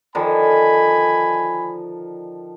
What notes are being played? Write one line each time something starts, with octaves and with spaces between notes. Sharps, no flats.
D3 D#3 F3 G#5 B5